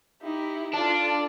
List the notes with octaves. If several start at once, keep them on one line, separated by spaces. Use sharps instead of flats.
D#4 E4 G4
D4 F4 A4